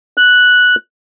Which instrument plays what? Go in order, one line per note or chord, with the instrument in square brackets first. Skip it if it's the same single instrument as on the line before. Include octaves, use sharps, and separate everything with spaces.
[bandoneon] F#6